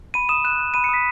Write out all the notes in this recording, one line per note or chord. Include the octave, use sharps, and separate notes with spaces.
B5 D#7
D#6 E7
F#6 E7
F#6
B5 D#7
C#7
D#6 B6